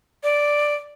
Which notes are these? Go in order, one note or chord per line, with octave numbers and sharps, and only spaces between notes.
D5